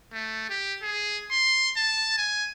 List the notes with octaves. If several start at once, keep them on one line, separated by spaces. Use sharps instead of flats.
A3
G4
G#4
C6
A5
G#5